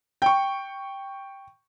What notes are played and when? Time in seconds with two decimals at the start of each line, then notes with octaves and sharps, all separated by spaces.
0.22 G5 C#6